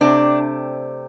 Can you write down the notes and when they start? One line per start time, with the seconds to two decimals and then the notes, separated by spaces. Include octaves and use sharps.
0.01 C3 A3 C4 D4